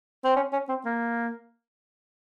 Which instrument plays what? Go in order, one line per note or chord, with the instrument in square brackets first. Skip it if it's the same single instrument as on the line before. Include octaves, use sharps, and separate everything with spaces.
[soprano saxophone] C4
C#4
C#4
C4
A#3